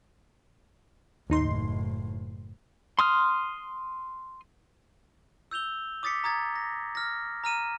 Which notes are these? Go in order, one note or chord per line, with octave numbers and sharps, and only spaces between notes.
F#1 D#2 A2 D#4 C6
C6 D#6 F6
E6 G6 F7 G7
D6 D#6 A6 B6 C#7
A#5 D#6 G#6 A6
A#6
F6 A#6
A#5 F6 D#7 E7